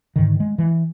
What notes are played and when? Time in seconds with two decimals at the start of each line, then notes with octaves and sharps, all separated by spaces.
0.16 G#2 D3 D#3
0.40 G#3
0.58 E3